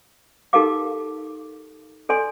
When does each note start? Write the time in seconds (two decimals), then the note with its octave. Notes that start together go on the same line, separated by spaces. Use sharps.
0.53 D#4 G4 A4 A#4 F5 D6
2.09 A4 D5 G#5 C6